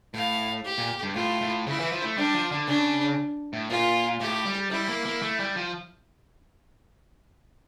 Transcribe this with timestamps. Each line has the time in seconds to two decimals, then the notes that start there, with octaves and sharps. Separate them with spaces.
0.14 A2 F5
0.65 G4
0.78 A#2
1.03 G2
1.16 A2 F4
1.41 A2
1.67 C#3 E4
1.80 E3
1.92 F3
2.05 A3
2.17 G3 D4
2.34 F3
2.52 D3
2.68 C#3 D4
3.53 A2
3.70 A#2 F4
4.21 A2 G4
4.46 G3
4.71 G3 E4
4.89 A#3
5.06 A#3
5.22 A3
5.40 G3
5.56 F3